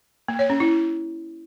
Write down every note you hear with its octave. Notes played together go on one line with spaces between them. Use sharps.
A#3
C#5
C#4
E4